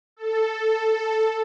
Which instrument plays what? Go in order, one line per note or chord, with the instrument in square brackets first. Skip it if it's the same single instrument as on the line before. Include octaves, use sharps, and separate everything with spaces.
[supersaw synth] A4